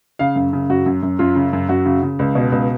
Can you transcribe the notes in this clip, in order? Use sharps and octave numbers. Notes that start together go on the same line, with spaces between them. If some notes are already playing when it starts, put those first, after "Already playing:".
C#3 F5
F#2
C#3
F#2 F#4
F#2
F#2
F#2 F4
C#3
F#2
F#2 F#4
C#3
C#3
C#2
B2
C#2